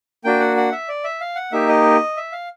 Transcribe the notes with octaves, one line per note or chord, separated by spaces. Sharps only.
A#3 D4 F#4 G5
F#5
F#5
E5
D5
E5
F5
F#5
A#3 D#4 G4 E5
D#5
E5
F5